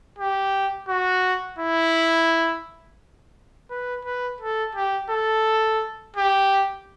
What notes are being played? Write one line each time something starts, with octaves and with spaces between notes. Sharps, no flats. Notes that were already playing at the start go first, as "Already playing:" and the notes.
G4
F#4
E4
B4
B4
A4
G4
A4
G4